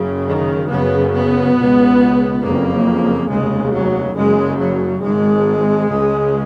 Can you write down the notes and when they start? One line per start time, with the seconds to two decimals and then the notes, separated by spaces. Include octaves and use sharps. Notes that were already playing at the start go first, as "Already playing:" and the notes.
Already playing: F#1 F#2 C#3
0.27 D#3
0.70 F#1 F#2 C#3 B3
1.13 B3
1.56 C#2 B2
2.43 F#1 F2 C#3 A#3
3.29 F1 D#2 C#3 G#3
3.72 F#3
4.15 F#1 F#2 C#3 G#3
4.59 F#3
5.01 G#1 G#2 G#3
5.88 C#2 C#3